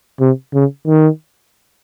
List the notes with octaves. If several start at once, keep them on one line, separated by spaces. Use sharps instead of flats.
C3
C#3
D#3